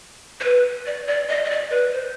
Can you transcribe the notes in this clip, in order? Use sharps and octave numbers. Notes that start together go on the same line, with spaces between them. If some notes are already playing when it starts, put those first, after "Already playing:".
C5
B4
D5
D5
D#5
D#5
D5
B4
C5